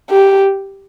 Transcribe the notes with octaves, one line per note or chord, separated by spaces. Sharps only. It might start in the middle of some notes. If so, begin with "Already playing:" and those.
G4